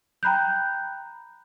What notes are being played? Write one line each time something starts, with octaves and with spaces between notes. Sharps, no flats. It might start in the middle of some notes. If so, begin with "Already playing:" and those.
G5 A#5 B5 F#6 G6